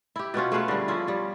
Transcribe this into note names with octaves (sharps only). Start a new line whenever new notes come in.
E4 G4
B2 B3 C#4 F4
A3 G#4 B4 F5
D3 G3
F3 C#4 E4 F4
G3 F4